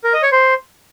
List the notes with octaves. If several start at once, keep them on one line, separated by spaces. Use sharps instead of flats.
A#4
D#5
C#5
C5